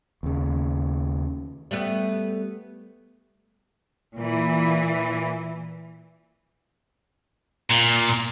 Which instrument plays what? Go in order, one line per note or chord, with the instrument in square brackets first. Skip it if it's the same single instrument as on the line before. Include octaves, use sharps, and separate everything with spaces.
[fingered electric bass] D#2 C#3
[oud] G3 A3 B3
[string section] A#2 E3
[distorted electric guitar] A#2